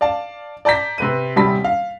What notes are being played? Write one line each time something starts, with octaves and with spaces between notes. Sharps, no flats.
D5 F5 A5
D5 A5 A#5 G6 B6
C3 B4 D#7
D#1 C3 G3 A5 B5 B6
F5